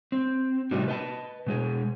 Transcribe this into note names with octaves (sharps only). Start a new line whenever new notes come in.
C4
A2 C3 G3 D#4 F#4
B4 D#5 A5
B2 G#3 G#4